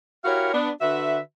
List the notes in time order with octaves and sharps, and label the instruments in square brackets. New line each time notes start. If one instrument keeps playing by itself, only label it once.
[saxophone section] E4 F#4 G4 A#4 C#5 F5
B3 D4
D3 F#4 B4 E5